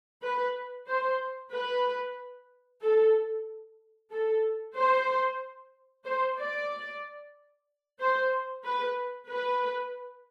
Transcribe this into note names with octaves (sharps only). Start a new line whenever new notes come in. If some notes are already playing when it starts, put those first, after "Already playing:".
B4
C5
B4
A4
A4
C5
C5
D5
C5
B4
B4